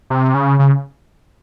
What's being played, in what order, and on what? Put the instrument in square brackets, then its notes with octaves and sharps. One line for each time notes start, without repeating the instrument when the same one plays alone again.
[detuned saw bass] C3
C#3
C#3